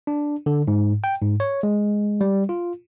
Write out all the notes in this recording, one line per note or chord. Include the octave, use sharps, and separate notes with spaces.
D4
D3
G#2
G5
G#2
C#5
G#3
G3
F4